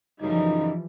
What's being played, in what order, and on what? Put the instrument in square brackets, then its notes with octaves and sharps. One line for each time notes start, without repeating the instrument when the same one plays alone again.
[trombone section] F#2 C#3 D#4 [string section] E3 F3 G3